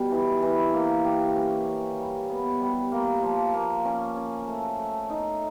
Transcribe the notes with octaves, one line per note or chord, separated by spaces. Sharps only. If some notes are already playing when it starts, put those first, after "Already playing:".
Already playing: B2 G3
E3
E3
A#3
G4
C#4
C#4
G3
B3
G3
A#3
F3
A#3
C#4
C#4
A3
A3
D#4